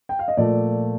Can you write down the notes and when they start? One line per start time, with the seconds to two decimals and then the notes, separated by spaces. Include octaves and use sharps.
0.09 G5
0.19 F5
0.28 D#5
0.37 A#2 F3 A3 D5